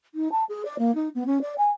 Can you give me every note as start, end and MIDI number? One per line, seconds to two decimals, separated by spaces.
0.15 0.31 63
0.32 0.44 81
0.49 0.63 68
0.65 0.76 74
0.79 0.94 58
0.95 1.09 63
1.15 1.26 59
1.27 1.39 61
1.42 1.54 74
1.58 1.70 80